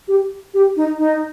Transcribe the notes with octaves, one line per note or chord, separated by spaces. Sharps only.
G4
G4
D#4
D#4